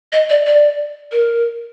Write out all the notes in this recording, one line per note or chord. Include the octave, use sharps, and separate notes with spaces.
D#5
D5
D5
A#4